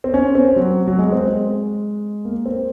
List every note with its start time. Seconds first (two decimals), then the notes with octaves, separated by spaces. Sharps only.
0.04 C4
0.14 C#4
0.35 C4
0.56 F#3
0.88 F#3
0.99 G#3
1.12 C4
1.26 G#3
2.25 A#3
2.46 C4